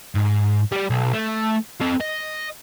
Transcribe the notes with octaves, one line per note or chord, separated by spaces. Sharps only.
G#2
G3 D5
B1
A3
C4 A4
D#5